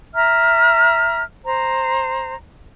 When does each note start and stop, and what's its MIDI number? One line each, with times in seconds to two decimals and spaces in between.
0.13 1.23 76
0.13 1.23 82
0.13 1.23 89
1.46 2.35 72
1.46 2.35 82